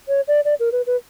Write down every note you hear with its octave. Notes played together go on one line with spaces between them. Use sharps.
C#5
D5
D5
A#4
B4
B4